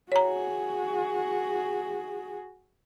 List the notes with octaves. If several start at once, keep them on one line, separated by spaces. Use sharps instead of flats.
F#4 G#4 C#5 A#5